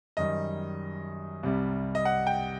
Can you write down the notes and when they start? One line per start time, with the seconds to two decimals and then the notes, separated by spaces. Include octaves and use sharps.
0.17 F#2 D#3 G3 D#5
1.43 C2 C3 G3
1.95 D#5
2.05 F#5
2.27 G5